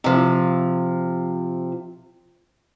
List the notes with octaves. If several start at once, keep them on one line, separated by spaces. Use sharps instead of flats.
C3 F3